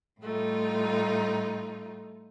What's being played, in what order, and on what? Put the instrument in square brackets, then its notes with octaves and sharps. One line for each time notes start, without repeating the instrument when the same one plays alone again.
[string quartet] A2 G3 A3 D#4 F4